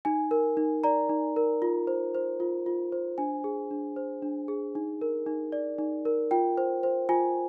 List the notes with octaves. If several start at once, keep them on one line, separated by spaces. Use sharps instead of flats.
D#4 G#5
A#4
D#4
D5 A#5
D#4
A#4
F4
C5
C5
F4
F4
C5
D4 G#5
G#4
D4
C5
D4
G#4
D#4
A#4
D#4
D5
D#4
A#4
F4 G5
C5
C5
F4 G#5